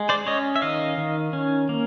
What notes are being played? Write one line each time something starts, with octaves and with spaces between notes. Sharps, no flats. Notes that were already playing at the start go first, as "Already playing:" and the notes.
Already playing: G#3
C5 D5
C#4 C#5 D#5
E5
D#3 D#5 F5
D#3
C#4
A#3